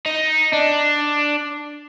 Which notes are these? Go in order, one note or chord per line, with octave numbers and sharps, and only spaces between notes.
D#4
D4